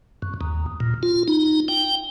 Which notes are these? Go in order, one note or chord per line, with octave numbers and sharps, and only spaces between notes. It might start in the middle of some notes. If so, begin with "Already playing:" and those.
F#2
D#2
A#2
F4
D#4
G5